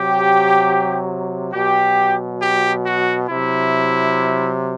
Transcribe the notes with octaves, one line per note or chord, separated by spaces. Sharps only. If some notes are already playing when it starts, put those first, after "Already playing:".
Already playing: C3 F#3 G4
B2 F#3 G4
G4
F#4
C3 F#3 E4